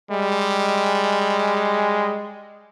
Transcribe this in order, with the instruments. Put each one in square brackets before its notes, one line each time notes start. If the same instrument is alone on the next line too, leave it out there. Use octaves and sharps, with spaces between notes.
[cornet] G3 [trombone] G#3